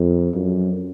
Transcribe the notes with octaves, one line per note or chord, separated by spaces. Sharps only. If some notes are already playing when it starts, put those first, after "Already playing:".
Already playing: F2
F#2